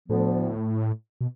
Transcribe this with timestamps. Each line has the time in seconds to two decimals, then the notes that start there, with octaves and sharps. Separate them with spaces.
0.09 D2 A2 D3 F3 B3
1.21 B2